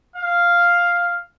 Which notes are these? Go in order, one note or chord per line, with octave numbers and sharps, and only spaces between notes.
F5